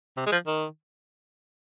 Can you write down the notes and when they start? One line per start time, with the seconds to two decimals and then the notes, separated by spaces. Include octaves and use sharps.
0.17 C3
0.26 G#3
0.32 F3
0.47 D#3